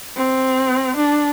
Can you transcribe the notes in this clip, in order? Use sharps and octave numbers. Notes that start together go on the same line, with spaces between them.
C4
D4